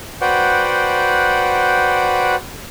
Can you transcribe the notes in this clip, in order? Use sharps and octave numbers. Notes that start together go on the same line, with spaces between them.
F#4 B4 C5 D5 F#5 G5